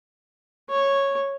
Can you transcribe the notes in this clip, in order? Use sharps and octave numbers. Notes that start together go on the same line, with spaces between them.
C#5